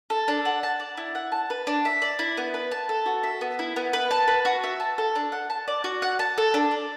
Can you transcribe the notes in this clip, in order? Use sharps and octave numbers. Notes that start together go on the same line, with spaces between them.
A4
D4
F#5
A5
D5
E4
F#5
A5
B4
D4
E5
D5
E4
B3
B4
A5
A4
F#4
E5
B3
E4
B3
B4
A5
B4
F#4
E5
A5
A4
D4
F#5
A5
D5
F#4
F#5
A5
A4
D4
D5